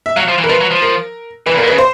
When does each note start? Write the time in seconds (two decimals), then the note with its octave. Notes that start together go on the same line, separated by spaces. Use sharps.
0.06 E5
0.16 F#3 F5
0.28 F3
0.38 E3
0.44 A#4
0.49 F3 B4
0.61 F#3
0.71 F3
0.82 A#4
1.46 E3 B4
1.55 A#2 A#4
1.63 B2
1.67 B4
1.71 C#3
1.78 C5